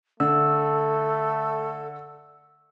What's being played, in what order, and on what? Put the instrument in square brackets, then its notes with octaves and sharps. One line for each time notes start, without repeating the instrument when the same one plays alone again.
[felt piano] D3 [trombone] A3 [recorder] A4 [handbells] E6